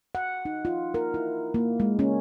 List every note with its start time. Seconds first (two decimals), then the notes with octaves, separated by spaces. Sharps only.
0.15 F#5
0.45 D#4
0.65 F4
0.94 A#4
1.14 E4
1.54 A#3
1.80 G#3
1.99 C#4